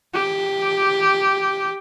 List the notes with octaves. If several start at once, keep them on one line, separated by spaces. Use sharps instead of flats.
G4